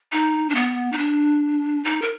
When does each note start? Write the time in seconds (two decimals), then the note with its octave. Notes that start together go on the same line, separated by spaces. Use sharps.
0.12 D#4
0.50 D4
0.55 B3
0.92 D#4
0.98 D4
1.84 D#4
2.02 A#4